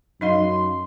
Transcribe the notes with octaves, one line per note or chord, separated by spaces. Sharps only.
F#2 D#4 D#5 F5 C6